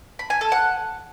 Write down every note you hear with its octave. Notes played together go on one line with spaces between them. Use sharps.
B5
G#5
A4
F#5